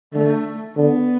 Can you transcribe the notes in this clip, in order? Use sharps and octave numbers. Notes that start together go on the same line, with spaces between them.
D3 A3
D3 B3